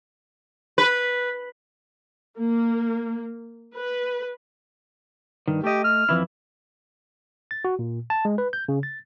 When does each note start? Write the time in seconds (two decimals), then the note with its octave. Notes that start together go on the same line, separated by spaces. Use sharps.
0.78 B4
2.39 A#3
3.74 B4
5.48 G2 D#3
5.64 A3 G4 D#5
5.84 F6
6.09 F2 E3 E4
7.51 A6
7.65 F#4
7.79 A#2
8.10 A5
8.25 G#3
8.38 B4
8.53 G6
8.68 C#3
8.83 A6